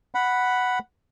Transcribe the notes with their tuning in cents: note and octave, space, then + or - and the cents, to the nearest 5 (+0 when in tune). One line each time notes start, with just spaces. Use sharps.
F#5 +0 B5 +0